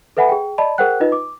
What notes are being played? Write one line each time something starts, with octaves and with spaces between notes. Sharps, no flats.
A4 B4 E5 F#5 G#5 B5
G#4 G5
D5 D#5 A5 B5
G#4 A#4 C5 F#5 G5 F#6
D#4 F4 B4 D#5
D6